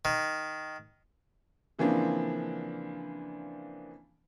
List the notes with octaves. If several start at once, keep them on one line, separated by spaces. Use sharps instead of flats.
D#3
C#3 E3 F3 A#3 C4 D4